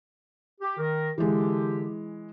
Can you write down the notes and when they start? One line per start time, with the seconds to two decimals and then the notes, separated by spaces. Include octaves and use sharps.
0.61 G4
0.78 D#3 A#4
1.18 D3 E3 G#3 G4